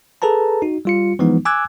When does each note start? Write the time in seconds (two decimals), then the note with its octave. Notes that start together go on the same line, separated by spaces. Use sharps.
0.22 G#4 A4 B4 A5 A#5
0.62 D#4 F#4
0.85 G3 F4 C#7
1.19 E3 F3 G#3 B3 D#4
1.45 G#5 D6 E6 F#6 G#6